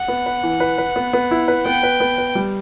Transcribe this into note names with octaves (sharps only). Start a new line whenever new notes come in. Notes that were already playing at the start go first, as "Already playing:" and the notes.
Already playing: F#5
B3
B4
E3
B4
B4
B3
B3
E4
B4
B3 G5
B4
B3
B4
G3